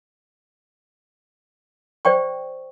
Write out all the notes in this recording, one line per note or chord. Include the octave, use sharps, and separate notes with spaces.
C5 D5 G5 C#6